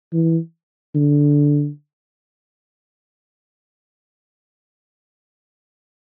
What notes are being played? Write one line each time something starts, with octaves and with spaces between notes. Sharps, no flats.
E3
D3